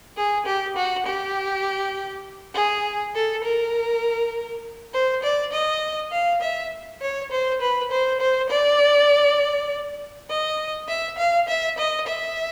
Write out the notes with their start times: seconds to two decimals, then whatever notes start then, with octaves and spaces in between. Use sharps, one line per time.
0.17 G#4
0.46 G4
0.76 F#4
1.06 G4
2.54 G#4
3.15 A4
3.44 A#4
4.93 C5
5.23 D5
5.52 D#5
6.12 F5
6.41 E5
7.01 C#5
7.31 C5
7.61 B4
7.91 C5
8.20 C5
8.50 D5
10.29 D#5
10.88 E5
11.18 F5
11.48 E5
11.78 D#5
12.07 E5